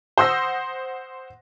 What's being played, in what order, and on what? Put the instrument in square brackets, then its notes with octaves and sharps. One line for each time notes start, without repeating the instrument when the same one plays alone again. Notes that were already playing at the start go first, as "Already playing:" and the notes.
[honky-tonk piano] C5 F#5 C6 D#6 E6 A#6